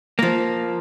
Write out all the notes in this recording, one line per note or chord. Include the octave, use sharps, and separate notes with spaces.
F3 A#3